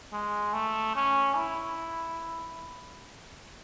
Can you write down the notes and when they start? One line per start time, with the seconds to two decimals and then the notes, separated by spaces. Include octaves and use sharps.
0.13 G#3
0.53 A3
0.95 C#4
1.36 E4